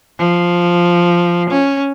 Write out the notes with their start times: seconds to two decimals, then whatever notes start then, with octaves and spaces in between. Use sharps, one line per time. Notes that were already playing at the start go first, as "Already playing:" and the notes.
0.19 F3
1.50 C#4